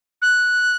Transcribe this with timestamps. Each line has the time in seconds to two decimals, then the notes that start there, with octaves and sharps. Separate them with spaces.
0.22 F#6